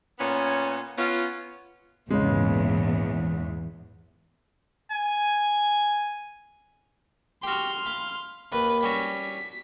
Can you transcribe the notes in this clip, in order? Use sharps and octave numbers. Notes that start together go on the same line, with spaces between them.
A#2 B3 C#4 C#5
B3 C#4 F4
A#1 E2 G#2 C#3 G#3
G#5
F#4 G4 C6 F6
F5 B5
D#2 B4
G3 C#4 F#4 B6